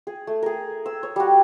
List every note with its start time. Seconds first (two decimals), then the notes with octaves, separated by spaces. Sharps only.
0.07 G#4
0.27 A3
0.43 G#4 A#4
0.86 E6
1.03 C#5
1.16 G3 F#4